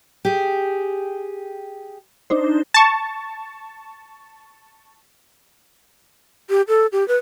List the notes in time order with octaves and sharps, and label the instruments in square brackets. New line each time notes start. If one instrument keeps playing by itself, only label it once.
[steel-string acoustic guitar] G4 G#4
[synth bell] D4 D#4 C5
[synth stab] A5 C#6
[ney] G4
A4
G4
B4